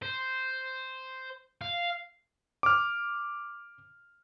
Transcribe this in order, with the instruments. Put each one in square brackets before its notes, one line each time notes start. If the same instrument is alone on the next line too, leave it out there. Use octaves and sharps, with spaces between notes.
[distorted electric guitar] C5
F5
[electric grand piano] D6 F6